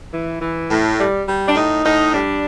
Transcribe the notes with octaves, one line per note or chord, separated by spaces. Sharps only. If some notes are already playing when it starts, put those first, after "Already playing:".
E3
E3
A2
G3
G3
D4
A2 D#4
A2 D#4
G3 D4